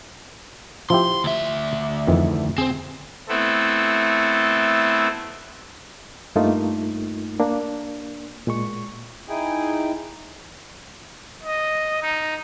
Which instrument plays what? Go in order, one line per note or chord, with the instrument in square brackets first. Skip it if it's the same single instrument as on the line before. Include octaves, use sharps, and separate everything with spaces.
[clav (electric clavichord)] F3 E4 G4 [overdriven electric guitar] C6
[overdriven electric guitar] D2 E5
[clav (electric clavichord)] F2 D#3 E3
[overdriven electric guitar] C4 [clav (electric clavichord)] G#4 C5
[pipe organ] A3 B3 C4 E4 A4
[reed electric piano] G2 A3 A#3 D#4 F4
A#3 D4
A#2 G#3 C#6
[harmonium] D#4 E4 G#4 G5 G#5
[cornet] D#5
D#4